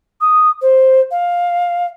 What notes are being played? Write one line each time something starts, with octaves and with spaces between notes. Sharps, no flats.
D#6
C5
F5